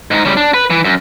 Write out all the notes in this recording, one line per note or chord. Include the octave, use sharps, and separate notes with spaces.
G#2 D#4
C#3 G3
D4
B4
E3
F#2